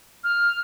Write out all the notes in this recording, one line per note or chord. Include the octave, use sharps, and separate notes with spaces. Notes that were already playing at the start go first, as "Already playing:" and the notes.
F6